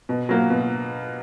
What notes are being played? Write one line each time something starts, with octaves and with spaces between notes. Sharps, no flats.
B2
F#3 A#3
B2